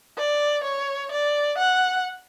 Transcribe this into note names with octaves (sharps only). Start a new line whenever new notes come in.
D5
C#5
D5
F#5